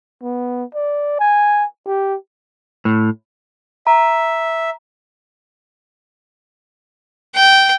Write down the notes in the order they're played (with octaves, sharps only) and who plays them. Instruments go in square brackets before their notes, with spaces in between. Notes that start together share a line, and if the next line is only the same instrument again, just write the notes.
[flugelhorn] B3
D5
G#5
G4
[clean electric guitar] A2
[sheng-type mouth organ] E5 [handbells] A#5
[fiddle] G5